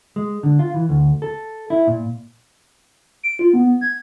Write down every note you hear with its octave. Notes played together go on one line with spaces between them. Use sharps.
G#3
D3
F4
E3
D2
A4
E4
A#2
D7
F4
B3
G#6